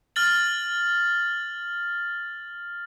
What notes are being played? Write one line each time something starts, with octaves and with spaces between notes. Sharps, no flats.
F6 A6 F#7